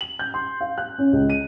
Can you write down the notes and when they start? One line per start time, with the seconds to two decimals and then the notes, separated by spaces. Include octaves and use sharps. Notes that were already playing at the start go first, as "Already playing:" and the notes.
0.01 F#7
0.19 G6
0.34 C6
0.61 F5
0.78 F#6
0.99 C#4
1.13 C#2
1.30 D#7